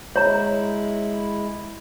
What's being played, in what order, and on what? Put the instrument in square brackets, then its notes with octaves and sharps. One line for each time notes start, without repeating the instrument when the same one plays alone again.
[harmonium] G#3 E4 [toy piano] C#5 A#5